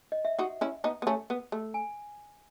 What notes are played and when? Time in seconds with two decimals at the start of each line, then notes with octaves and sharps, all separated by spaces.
0.12 D#5
0.25 E5
0.39 D#4 F#4 F#5
0.61 C#4 E4
0.84 B3 D#4
1.02 B3
1.07 A3 C#4
1.30 B3
1.52 A3
1.74 G#5